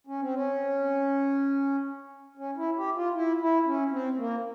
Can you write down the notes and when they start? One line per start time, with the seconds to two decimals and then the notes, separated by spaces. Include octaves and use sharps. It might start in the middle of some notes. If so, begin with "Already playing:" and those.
0.07 C#4
0.21 C4
0.34 C#4
2.37 C#4
2.57 E4
2.77 G4
2.95 F4
3.14 E4
3.41 E4
3.66 C#4
3.91 C4
4.18 A#3